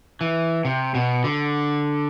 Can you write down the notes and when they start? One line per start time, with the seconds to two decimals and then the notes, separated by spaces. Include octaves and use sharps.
0.21 E3
0.65 C3
0.95 B2
1.24 D3